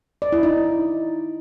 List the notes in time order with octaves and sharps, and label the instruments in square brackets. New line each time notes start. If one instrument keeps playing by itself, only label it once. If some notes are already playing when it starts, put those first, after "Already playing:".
[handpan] D5
E4
D#4